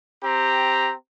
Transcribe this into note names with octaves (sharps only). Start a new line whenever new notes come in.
C4 G4 A#5